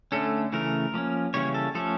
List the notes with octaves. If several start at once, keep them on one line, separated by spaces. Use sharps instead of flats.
D3 A3 C#4 A4
C#3 E3 A3 A#4
F3 A#3 C#4
C#3 E3 G3 A#3 C#4 C#5
A4
F3 A3 C#4 A4